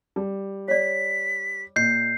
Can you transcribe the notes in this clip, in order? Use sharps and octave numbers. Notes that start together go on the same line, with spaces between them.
G3
C#5 D5 B6
A#2 D#5 G6 C7